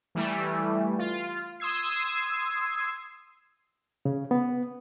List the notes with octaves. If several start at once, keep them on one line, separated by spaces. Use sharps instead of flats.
E3 G3 A3
F4
C6 D#6 E6 G#6 C7
C#3
B3